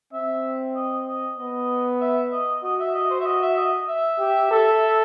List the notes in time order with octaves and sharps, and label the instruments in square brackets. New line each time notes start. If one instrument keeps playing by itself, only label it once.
[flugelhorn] C4 [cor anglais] E5
[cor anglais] D#5
D#5
[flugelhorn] B3 [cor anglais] D#5
[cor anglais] E5
D#5
[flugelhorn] F#4 [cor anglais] D#5
[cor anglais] E5
D#5
C5
E5
D#5
E5
D#5
D#5
E5
[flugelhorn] G4
A4